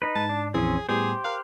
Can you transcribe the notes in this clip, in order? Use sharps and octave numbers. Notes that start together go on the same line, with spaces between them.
D#4 B4
G#2 A5
D4
A#1 F2 E3 C4 C#4 G#4
A2 G3 B3 G4 G#4 C5
A#4 F5 F6 F#6